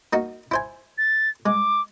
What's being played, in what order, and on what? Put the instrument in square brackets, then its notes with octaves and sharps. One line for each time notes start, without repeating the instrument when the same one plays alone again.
[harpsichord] A#3 D#4 F#4
E4 C5 G#5
[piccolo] A6
[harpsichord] G#3 [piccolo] D6